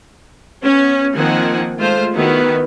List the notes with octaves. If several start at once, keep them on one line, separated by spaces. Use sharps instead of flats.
B3 C#4
D#3 F3 A#3 C4 F#5 G#5
G#3 A3 F4 C5
D#3 B3 E4 F#4 B4